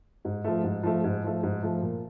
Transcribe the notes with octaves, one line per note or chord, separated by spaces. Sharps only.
G#2
F3 A3
G#2
F3 A3
G#2
F3 A3
G#2
F3 A3
A#2